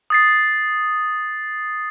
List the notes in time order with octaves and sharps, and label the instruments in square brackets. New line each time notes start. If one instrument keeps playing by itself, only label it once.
[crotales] D#6 A6 C7